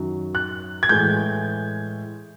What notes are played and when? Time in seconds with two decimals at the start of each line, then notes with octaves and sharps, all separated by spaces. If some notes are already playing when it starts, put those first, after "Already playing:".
Already playing: F#2 D#3 F#3
0.35 F#6
0.83 G#6
0.89 A2 E3 G#3 G6